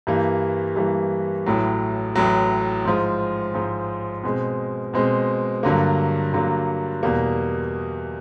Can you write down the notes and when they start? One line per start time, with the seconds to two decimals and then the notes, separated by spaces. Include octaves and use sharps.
0.07 G2 E3 G3 A#3
0.76 G2 E3 G3 A#3
1.46 A1 A2 F#3
2.15 A1 A2 F#3
2.85 G#2 F3 G#3
3.54 G#2 F3 G#3
4.24 B2 G#3 C4
4.94 B2 G#3 C4
5.63 G2 D3 F#3 A#3
6.33 G2 D3 F#3 A#3
7.03 E2 B2 G3 A#3